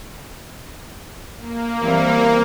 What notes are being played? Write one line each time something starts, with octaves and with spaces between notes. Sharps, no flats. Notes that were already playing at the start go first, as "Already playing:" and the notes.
A#3
E3 G3 C4